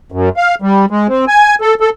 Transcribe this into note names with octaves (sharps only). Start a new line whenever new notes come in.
F#2
F5
G3
G#3
C4
G#5
A4
A4